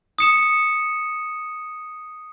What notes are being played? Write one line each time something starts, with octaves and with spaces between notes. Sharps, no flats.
D#6 C#7 E7